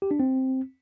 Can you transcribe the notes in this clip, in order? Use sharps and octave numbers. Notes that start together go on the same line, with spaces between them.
G4
D4
C4